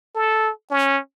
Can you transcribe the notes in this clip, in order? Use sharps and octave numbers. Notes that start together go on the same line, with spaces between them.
A4
C#4